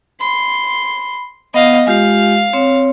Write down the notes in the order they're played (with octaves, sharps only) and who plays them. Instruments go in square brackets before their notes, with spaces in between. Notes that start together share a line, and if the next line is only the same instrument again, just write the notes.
[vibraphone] B5 [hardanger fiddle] C6
[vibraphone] B3 F#5 [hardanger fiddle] D#5 F5
[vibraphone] G#3 F4 G4 [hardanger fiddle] F5
[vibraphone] C4 C#5